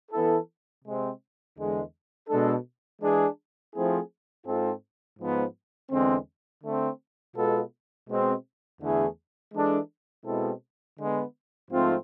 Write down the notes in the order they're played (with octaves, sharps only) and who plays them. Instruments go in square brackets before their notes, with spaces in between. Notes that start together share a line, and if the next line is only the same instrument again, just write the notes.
[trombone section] E3 B3 E4 A4
C3 G#3 C4
E2 D3 G#3
B2 G#3 D4 A4
E3 G#3 D4 G#4
F3 A3 C4 E4 G#4
G#2 G#3 C4 F4 A4
G#2 F3 B3
E2 D3 G#3 C4
D3 A3 C4
B2 G#3 B3 F4 A4
B2 G#3 C4
E2 D3 A3 E4 G#4
E3 G#3 D4 A4
B2 G#3 C4 E4 A4
D3 G#3 B3
G#2 F3 A3 C4 F4